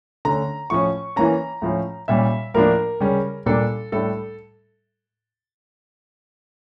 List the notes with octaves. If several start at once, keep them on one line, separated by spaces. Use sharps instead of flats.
D3 A3 C#4 A#5
A2 F3 C#4 C#6
E3 A#3 C#4 A#5
A2 F3 C#4
A#2 G3 C#4 E5
A2 F3 A#3 D4 A#4
C#3 G3 C#4
A#2 G3 A#3 D4 A4
A2 G3 D4 A4